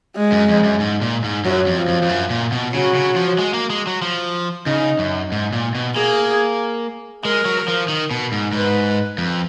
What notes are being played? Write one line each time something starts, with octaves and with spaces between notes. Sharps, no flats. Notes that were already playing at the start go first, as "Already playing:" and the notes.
G#3
F#2
F2
F#2
G#2
A#2
G#2
F#2 F#3
F2
F3
F2
F2
F#2
A#2
B2
C#3 F#3
C#3
F3
G#3
A#3
G#3
F#3
F3
C#3 D#4
F#2
G#2
A#2
B2
A#3 G#4
G#3 A#4
F#3
F3
D#3
B2
G#2
G#2 B4
F2